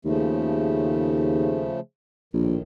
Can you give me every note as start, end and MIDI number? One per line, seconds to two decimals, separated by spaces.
0.05 1.70 39
0.05 1.80 49
0.05 1.80 53
0.05 1.80 57
2.34 2.56 34
2.34 2.62 45
2.34 2.62 51